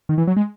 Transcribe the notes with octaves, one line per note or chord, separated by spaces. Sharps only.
D#3
E3
F#3
G#3